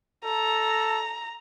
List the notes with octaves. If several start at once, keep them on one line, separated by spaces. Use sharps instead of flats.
A4 A#5